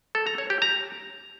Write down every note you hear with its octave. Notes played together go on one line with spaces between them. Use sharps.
A4
A#5
C#5
G4
A#5